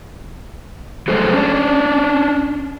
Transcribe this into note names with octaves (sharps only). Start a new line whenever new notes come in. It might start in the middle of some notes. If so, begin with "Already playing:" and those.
F3 F#3 G#3 A3 A4 C5
C#4 D4